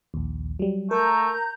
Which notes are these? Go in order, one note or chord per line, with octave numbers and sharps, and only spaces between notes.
A#1 D#2
F#3 G3
A3 A#4 A#5 G6